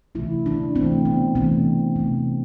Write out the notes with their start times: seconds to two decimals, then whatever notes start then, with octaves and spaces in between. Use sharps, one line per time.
0.15 C3 E3 A3 E4
0.46 D4
0.75 C3 E3 A3 C4
1.05 B3
1.35 C3 E3 A3 C4
1.96 C3 E3 A3